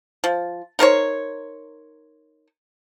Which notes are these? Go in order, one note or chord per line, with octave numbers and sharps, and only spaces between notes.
F3
D#4 A#4 C5 C#5